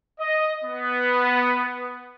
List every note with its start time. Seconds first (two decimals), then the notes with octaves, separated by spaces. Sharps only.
0.20 D#5
0.65 B3